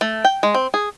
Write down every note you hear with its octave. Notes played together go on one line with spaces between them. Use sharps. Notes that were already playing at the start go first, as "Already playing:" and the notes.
A3
G5
G#3
C4
G#4